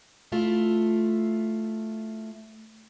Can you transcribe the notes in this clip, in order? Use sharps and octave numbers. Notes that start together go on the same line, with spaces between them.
A3 E4 F4